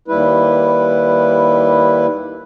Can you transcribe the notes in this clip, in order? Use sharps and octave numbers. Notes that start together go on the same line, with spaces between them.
D#2 G3 E4 B4